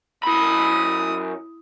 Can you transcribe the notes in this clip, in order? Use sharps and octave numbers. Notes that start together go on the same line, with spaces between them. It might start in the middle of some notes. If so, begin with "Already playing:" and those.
F#2 E4 B5 D#6